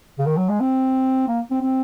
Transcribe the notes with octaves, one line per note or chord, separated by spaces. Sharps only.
C#3
D#3
F#3
G#3
C4
A#3
C4
C4